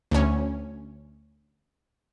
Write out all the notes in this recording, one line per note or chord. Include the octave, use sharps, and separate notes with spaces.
D2 C#4